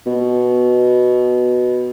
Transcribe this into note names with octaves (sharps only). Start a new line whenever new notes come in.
B2